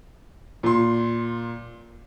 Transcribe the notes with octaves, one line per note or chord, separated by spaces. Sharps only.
A#2 C6